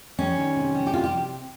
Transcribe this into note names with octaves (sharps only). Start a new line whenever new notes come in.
G3 C#4
D#3
C3
G3
G4
C3 F4
G4